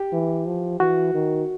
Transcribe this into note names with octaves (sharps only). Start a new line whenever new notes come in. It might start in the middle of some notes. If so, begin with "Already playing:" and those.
Already playing: G4
E3
F3
E3 F#4
D#3